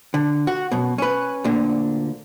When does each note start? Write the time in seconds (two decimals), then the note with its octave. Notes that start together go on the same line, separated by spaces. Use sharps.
0.14 D3
0.47 F#4
0.71 F#2 B2
0.98 C#4 B4
1.44 D2 A#2 D3